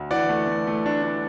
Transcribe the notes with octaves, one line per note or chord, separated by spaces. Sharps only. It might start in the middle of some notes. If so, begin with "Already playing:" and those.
Already playing: D2
E3 D5 F#5
A3
A3
A3
D4
D4